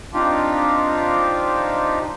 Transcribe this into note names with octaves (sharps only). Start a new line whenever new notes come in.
C4 D4 D#4 F4 G4